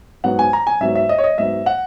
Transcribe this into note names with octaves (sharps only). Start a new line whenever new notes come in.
G#2 F#3 B3 F#5
G#5
A#5
G#5
G#2 F#3 B3 E5
E5
D#5
C#5
D#5
G#2 F#3 B3 E5
F#5